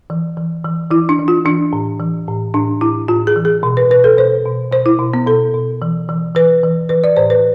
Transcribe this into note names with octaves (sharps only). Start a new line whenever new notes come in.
E3
E3
E3
E3 E4
D4
E3
F4
E3 D4
A2
E3
A2
A2 D4
A2 E4
A2 F4
G#4
E3
G#4
B2
B4
B2 B4
A4
B2 C5
B2
B2 C5
E4
B2
B3
B2 A4
B2
E3
E3
E3 B4
E3
E3 B4
D5
A2 C5
B4